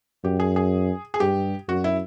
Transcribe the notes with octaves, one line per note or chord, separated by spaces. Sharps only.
F#2 G4
G#4
G#4
G#4
G2 G4
F#2 F#4
E4